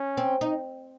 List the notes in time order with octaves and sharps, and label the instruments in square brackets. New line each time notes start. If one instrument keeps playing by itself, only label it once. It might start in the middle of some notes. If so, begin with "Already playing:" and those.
Already playing: [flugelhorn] C#4
[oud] C4
D#4